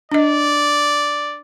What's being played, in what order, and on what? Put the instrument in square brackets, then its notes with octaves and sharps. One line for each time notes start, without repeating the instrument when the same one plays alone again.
[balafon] D4 D#5 [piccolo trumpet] D5